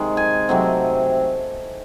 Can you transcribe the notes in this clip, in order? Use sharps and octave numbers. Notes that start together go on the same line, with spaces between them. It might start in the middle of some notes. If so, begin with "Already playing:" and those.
Already playing: C3 D#3 G#3
G#5
C3 F#3 A3 C4